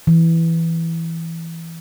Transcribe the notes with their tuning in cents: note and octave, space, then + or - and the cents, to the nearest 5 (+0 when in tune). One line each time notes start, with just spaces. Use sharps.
E3 +0